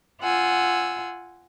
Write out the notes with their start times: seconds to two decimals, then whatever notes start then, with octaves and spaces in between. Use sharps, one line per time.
0.23 F4 F#5 G#5 E6